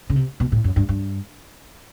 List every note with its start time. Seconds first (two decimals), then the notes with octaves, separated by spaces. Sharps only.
0.10 C#3
0.16 C3
0.40 B2
0.52 A2
0.64 F#2
0.76 G2
0.89 G2